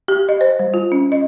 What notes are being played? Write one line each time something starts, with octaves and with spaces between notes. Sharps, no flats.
G4
D#5
C5
G3
F4
C#4
D#5